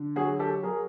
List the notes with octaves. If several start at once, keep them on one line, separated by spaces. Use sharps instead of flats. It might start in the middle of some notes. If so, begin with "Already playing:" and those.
Already playing: D3
F#3 F#4 G#4
G4 A4
F#3 G#4 A#4